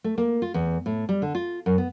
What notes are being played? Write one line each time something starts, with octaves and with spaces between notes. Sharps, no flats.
A3
A#3
F4
E2
A2
G3
D3
F4
F#2
B3